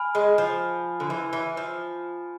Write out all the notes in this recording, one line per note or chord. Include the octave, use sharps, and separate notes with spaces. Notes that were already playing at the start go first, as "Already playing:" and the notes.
Already playing: G#5 B5 F6
G#3
F3
D3
E3
E3
F3